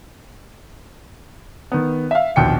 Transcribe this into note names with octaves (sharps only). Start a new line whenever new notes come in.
D#3 B3
E5 F5
A#1 D#2 B2 G5 C#7